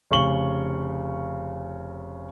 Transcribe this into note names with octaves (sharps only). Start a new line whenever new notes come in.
F1 C#3 C#6 F#7 G7